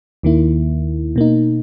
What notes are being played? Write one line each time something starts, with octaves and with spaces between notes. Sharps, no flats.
D#2 D#3 A#3 E4
B2 A#3 D#4